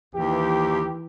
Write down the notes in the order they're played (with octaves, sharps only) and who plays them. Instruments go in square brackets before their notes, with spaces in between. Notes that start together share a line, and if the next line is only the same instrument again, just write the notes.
[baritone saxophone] D#2 [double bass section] E3 [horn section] G4